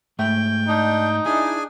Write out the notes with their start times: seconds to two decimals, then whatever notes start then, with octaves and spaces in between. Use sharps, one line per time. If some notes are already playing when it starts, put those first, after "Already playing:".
0.19 G#2 A3 E5 G5
0.68 D4 D#4
1.26 D4 E4 G#4 G#5